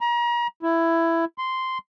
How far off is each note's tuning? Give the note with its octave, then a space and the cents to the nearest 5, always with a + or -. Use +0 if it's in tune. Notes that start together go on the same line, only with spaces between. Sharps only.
A#5 +35
E4 +10
C6 -10